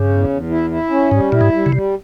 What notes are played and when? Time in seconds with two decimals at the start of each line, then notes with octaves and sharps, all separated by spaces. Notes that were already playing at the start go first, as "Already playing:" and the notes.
Already playing: G2 C#3
0.09 E2
0.29 E2
0.50 E4
0.70 E4
0.90 C#4
1.11 G#2 G3
1.32 A#2 E4
1.41 G#2
1.52 G3
1.66 C#3
1.72 C3 G3